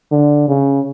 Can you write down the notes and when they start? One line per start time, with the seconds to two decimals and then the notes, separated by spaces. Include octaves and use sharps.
0.11 D3
0.48 C#3